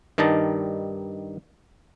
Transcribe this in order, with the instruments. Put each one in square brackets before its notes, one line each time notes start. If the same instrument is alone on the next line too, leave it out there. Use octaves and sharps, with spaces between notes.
[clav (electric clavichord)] G2 D#3 G3 D#4 A5 A#5